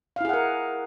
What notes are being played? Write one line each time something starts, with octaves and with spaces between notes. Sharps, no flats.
E4 G#4 A#4 F5 F#5